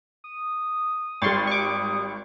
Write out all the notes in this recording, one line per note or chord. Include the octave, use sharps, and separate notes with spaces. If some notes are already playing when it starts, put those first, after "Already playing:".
D#6
G#1 G3 C6 C#6 A6
C#6 D6